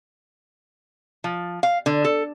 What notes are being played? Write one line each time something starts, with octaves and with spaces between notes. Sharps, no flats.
F3
F5
D3
A4